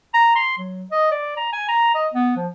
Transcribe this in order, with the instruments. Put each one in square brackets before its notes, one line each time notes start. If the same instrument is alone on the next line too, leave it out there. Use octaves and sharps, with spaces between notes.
[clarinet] A#5
C6
F#3
D#5
D5
A#5
G#5
A#5
D#5
B3
F3